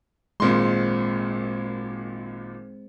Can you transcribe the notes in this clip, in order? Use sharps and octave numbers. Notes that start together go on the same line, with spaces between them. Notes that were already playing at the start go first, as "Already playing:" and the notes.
G#1 A#2 G#3 C4 C5 C6